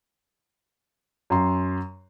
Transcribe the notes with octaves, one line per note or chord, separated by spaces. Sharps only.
F#2 C6